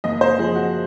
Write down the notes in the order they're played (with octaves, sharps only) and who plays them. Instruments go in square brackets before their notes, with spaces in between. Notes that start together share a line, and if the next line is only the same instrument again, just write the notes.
[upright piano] F#1 D#5
C5
F3 G#4
F#4